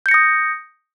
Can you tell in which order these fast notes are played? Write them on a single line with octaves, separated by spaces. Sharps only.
G6 C#7 A#6 D#6